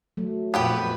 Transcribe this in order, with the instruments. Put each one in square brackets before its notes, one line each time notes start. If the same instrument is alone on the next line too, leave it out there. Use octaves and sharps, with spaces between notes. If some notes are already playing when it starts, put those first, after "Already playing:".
[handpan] F#3 A3
[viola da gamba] F2 A#2 B4 [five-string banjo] B3 G4 G5